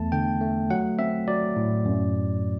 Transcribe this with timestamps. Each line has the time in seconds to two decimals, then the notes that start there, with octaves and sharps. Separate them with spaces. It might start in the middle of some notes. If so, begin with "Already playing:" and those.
Already playing: E2 A3 A5
0.12 D3 G5
0.41 A3
0.70 F#3 F#5
0.99 C4 E5
1.28 F#3 D5
1.56 A2
1.85 F#2